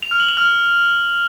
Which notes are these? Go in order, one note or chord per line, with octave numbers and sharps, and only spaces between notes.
F7
F6
F#7
F7
F6